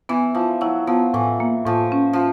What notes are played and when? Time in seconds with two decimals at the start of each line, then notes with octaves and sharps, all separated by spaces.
0.09 E3 B3
0.35 F3 E4
0.61 F#3 E4
0.87 F3 B3
1.14 A2 E3
1.40 A#3
1.65 A2 F3
1.92 C#4
2.13 F3